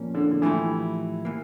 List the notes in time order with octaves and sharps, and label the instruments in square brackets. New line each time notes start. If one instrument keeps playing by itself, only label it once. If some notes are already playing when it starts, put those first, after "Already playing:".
Already playing: [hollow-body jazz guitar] A#2 F3 A#3 C#4
[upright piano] D3
D3
[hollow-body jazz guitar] A2 F3 A3 E4 G4 [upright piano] E3
[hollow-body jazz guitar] E3 A#3